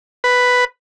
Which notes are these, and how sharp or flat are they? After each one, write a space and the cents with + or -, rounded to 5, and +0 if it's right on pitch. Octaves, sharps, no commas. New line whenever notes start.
B4 +5